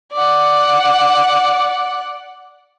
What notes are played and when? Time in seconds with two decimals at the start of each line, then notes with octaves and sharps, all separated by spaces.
0.13 D5 F#5